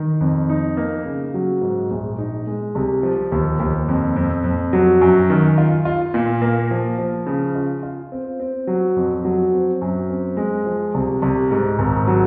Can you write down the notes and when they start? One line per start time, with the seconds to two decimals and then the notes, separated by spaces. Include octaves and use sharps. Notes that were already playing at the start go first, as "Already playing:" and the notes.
Already playing: D#3
0.21 F2
0.49 D#4
0.77 A#3
1.06 C#3
1.34 F#3
1.61 G#2
1.90 A#1
2.18 D#4
2.47 G#3
2.75 C2
3.03 F3
3.32 D#2
3.60 D#2
3.88 F2
4.16 F2
4.44 F2
4.73 F#3
5.01 F#2
5.30 D#3
5.58 F4
5.85 F4
6.14 A#2
6.42 A#3
6.71 F3
6.98 F3
7.26 C#3
7.55 F4
7.83 F4
8.12 C4
8.40 C4
8.67 F#3
8.96 F2
9.25 F#3
9.52 C4
9.82 F#2
10.10 C4
10.37 G#3
10.66 F3
10.94 C2
11.22 C2
11.51 G#2
11.79 G#1
12.07 F#3